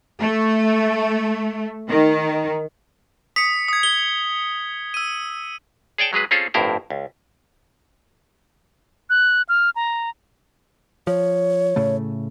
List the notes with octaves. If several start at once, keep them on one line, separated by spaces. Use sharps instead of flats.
A3
D#3
D#6 B6 C#7
D#6 G#6
G7
E6 D#7
G#4 C#5 D5 G5 A5
F#3 G#3 G#4 B4
C4 C#4 F4 G#4 A4 C#5
G1 F2 A2 E4 A#4 C5
C#2
F#6
F6
A#5
F3 C#5
A2 C#3 A3